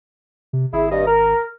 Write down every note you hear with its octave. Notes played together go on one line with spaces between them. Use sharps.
C3
G#1 E4 G#4
G2 D#5
A#4